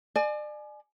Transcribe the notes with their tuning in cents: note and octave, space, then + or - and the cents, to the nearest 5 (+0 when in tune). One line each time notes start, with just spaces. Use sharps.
D5 +35 G#5 +30